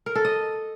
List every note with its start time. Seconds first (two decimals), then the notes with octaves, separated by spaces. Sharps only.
0.06 A#4
0.15 A4
0.25 D#5